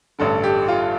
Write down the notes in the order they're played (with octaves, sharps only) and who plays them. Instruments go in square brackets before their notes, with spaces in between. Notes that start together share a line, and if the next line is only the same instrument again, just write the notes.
[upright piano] A1 G2 D3 A4
G4
F4